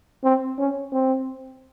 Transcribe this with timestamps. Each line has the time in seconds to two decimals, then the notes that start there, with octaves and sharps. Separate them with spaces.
0.24 C4
0.59 C#4
0.93 C4